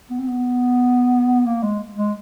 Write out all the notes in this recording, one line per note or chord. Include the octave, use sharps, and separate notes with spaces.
B3
C4
B3
A#3
G#3
G#3